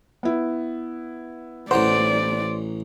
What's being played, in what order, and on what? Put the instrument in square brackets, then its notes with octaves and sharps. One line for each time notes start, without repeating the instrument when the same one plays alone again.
[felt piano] B3 E4
[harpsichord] A1 E3 A#5 [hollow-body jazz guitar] C5 [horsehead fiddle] D5 [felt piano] F#5